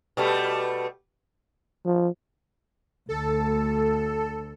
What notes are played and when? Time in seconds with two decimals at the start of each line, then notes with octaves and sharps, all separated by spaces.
0.17 B2 G3 A3
1.86 F3
3.09 D2 A4